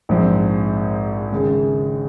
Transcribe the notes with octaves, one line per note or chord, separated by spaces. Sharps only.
A#1 G#2 F3 C4
D#2 C#3 G#3